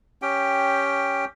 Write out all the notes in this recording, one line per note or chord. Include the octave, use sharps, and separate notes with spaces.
C#4 G4 G5